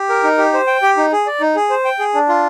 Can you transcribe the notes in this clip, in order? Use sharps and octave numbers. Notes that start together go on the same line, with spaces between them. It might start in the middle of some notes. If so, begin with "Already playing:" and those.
Already playing: G4
A#4
D#4
G4
C5
G5
G4
D#4
G#4
D5
D#4
G#4
C5
G5
G#4
D4
F4